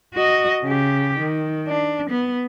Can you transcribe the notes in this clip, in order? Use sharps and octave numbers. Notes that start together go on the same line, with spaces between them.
F#4 D#5
C#3 G4
D#3
D4
B3